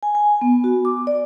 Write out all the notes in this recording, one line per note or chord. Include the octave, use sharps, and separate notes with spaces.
G#5
G#5
B3
F#4
D6
D5